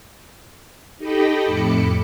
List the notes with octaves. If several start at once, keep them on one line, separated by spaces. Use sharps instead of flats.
D#4 G4 A4 D#5 G5 B5
F2 A2 A4 B5 D6 C#7